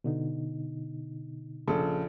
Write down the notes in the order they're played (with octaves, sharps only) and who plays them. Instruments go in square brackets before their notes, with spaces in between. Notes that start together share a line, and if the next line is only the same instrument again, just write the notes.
[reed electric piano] B2 D3 D#4
[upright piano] A#1 C#3 A4